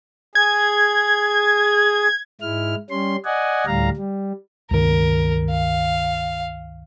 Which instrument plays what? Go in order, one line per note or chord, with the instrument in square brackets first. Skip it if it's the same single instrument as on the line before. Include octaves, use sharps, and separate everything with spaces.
[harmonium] G#4 [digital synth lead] G#6
[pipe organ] G#2 G#3 E4 F6
G3 C#4 C6
D5 D#5 F#5 G#5
D2 A2 G3 F5 A#5
G3
[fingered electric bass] C#2 G2 D#3 [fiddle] A#4
[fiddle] F5